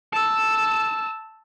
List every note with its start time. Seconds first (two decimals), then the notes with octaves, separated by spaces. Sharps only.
0.13 A5 E6